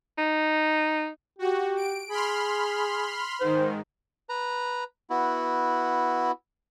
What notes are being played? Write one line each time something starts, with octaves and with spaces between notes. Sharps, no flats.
D#4
F#4 G4
D7
G#4 B5 C6 F6
G#2 D#3 C5
B4 A#5
B3 E4 F#4